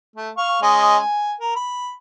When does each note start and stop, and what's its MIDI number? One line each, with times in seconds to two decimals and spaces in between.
0.16 0.30 57
0.37 0.60 77
0.37 0.60 85
0.62 0.98 56
0.62 0.98 61
0.62 0.98 75
0.99 1.33 80
1.40 1.51 70
1.56 1.91 83